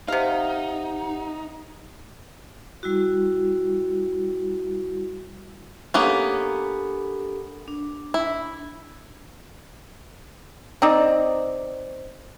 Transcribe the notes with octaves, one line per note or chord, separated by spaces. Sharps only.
C3 D#4 G4 F5 F#5
G3 E4 F#4
A#3 B3 C#4 D4 G4 A4
D4
E4
C4 D#4 D5